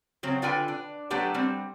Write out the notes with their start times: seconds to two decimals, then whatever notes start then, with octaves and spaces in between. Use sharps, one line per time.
0.23 C#3 F#3 C4
0.42 D3 F4 B4 G5 G#5
0.68 D4
1.10 F#3 A3 B3 D4 G4 A4
1.34 G3 C4